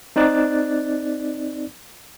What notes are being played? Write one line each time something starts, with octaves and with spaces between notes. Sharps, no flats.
C4 D#4 D5 F#6 A6